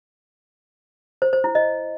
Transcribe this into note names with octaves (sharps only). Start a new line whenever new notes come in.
C5
C5
E4
D#5